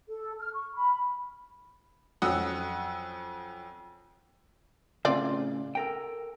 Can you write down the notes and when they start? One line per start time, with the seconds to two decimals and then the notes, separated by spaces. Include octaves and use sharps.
0.09 A4
0.39 F6
0.54 C#6
0.73 B5
2.22 F2 F#3 C#4 F#5 D#6 E6
5.05 A2 C#3 C4 F4 D5
5.75 A4 A#4 G5